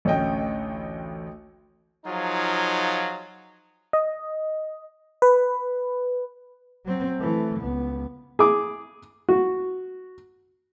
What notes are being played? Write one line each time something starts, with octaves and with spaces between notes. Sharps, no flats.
A1 D2 C#4 D#5 G5
F3 F#3 D#4 F4 G#4
D#5
B4
F#3 C4
E3 A3
C#2 B3
G#4 D6
F#4